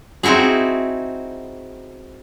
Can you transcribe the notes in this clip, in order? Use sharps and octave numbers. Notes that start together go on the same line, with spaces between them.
C4 D#4 E4 F#4 G#4